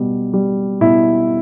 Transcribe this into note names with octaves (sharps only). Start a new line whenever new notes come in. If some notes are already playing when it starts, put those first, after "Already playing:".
Already playing: B2 G3
G3
B2 E4